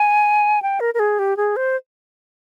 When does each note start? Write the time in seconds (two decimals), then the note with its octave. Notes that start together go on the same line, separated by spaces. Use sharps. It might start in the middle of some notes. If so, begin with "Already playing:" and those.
Already playing: G#5
0.62 G5
0.80 A#4
0.94 A#4
0.99 G#4
1.19 G4
1.37 G#4
1.56 C5